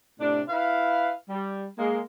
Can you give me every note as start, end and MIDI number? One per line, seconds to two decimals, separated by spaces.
0.20 0.41 45
0.20 0.41 48
0.20 0.41 62
0.48 1.10 64
0.48 1.10 71
0.48 1.10 77
1.28 1.66 55
1.77 2.00 56
1.77 2.00 58